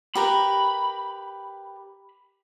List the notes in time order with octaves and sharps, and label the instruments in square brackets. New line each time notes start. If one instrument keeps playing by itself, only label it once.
[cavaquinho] G4 A#4 B4 [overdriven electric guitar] B5